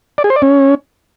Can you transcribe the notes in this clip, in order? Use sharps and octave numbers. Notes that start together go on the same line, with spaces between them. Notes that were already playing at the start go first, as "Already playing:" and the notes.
D5
G#4
C5
D5
C#4